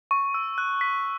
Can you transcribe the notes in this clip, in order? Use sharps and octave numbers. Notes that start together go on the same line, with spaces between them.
C#6
E6
F#6
B6